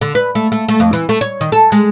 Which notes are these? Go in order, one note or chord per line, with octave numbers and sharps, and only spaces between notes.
D3
B4
A3
A3
A3
F2
E3
A3
C#5
D#3
A4
G#3